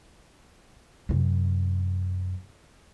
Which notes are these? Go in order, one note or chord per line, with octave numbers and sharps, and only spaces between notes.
F#2 C3